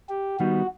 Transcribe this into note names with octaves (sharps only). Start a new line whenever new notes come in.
G4
D#3 G3 B3 D#4 F#4